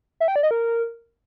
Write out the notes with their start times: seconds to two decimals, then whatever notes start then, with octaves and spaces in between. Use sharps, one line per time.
0.20 E5
0.28 G5
0.36 D5
0.43 D#5
0.51 A#4